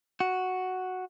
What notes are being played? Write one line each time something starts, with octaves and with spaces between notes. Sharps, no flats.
F#4